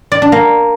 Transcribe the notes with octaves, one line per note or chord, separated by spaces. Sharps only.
D5
D4
A#3